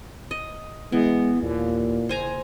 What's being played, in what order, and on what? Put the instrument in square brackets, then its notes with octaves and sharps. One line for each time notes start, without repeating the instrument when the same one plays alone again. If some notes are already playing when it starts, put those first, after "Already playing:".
[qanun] D#5
[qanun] E3 [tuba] G#3 [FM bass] B3
[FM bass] D#2 [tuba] A#2
[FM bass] F#1 [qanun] C5 G#5 A#5